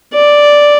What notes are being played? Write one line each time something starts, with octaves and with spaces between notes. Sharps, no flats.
D5